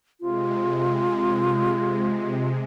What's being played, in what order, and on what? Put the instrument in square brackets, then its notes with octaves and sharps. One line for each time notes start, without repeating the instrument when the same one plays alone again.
[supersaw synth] C3 G#3 [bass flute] F4